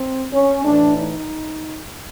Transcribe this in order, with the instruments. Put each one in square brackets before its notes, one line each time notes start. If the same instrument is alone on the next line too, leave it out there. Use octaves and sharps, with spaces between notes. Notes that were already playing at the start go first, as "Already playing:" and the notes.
Already playing: [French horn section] C4
C#4
A2 E3 A3 D4
D#4